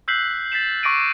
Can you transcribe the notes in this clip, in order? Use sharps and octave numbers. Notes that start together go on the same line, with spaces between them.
E6 F#6 G6 B6 C7 F#7
A6 B6 C7 E7
C#6 D6 A#6 D7 D#7